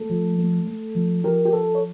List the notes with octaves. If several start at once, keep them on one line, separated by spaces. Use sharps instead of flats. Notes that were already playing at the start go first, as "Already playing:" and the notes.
Already playing: A3 A4
F3
A3
A3
F3
F3 G4 A#4
G4
F3 A4
C#5